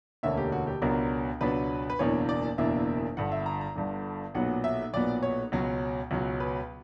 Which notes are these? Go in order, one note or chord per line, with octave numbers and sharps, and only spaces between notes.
E1 D2 D3 A#3 C#4 E5
G4
F#4
G4
C#2 B2 F#3 B3 D4 A#4
C#2 B2 F#3 B3 D4 B4
B4
F#1 E2 B2 A#3 D4 C#5
D5
F#1 E2 B2 A#3 D4 E5
G1 G2 D3 F#5
E5
A#5
A#5
G1 G2 D3
B1 A#2 F#3 B3 F#5
E5
B1 A#2 F#3 B3 D5
C#5
C#2 B2 F#3 C#4
C#2 B2 F#3 C#4
B4